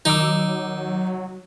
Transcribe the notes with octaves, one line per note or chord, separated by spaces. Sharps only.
D#3 F#3 D#4 D6 E6